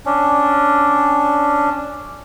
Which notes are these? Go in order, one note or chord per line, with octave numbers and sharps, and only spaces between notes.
C#4 D4